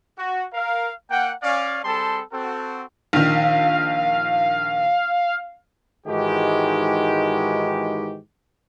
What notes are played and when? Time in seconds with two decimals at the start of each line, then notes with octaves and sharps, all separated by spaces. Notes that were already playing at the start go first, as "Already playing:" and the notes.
0.18 F#4
0.54 A#4 F5
1.10 A#3 F#5 G5
1.42 C#4 D5 F5
1.84 G3 C4 G#4 A4 A5 C6
2.32 C4 F#4 A4
3.13 A#1 D#3 F5
6.07 G#2 D#3 E3 G#3 F#4 G4